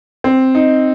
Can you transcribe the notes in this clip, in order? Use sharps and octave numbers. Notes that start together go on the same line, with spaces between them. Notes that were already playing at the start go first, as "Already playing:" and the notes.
C4
D#4